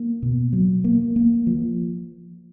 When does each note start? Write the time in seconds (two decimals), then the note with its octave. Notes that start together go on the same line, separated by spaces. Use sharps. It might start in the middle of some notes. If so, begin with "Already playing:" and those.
Already playing: A#3
0.23 B2
0.53 F#3
0.84 A#3
1.16 A#3
1.47 F3